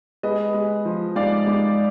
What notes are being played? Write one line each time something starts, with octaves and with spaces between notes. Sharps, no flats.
G#3 B4 D#5
G#3
F3
G#2 D5 F5
G#2